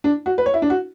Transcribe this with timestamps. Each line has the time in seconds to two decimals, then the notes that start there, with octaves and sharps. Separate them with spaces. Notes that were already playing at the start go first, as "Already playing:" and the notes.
0.04 D4
0.26 F#4
0.38 B4
0.46 C#5
0.54 E4
0.62 D4
0.70 F#4